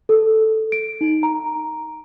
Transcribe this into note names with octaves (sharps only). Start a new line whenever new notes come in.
A4
D7
D#4
A#5